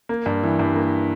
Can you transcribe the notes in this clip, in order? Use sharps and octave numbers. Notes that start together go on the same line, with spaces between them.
A#3
G2
E3
G2
A#3